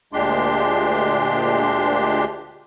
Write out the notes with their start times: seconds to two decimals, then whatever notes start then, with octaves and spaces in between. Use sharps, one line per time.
0.13 D2 A#2 G#3 D4 G4 C6